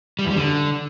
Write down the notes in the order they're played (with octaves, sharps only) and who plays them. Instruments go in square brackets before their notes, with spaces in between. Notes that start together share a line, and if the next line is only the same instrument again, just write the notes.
[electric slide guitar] G3
E2
G3
D3